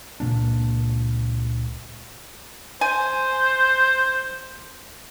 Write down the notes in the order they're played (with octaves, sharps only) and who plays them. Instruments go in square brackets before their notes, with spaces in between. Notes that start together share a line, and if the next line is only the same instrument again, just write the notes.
[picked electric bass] C#2 A#2 A#3 D4
[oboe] C5 [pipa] G#5